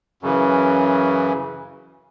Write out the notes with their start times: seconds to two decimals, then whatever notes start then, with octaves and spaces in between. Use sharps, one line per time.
0.22 F#2 C#3 E3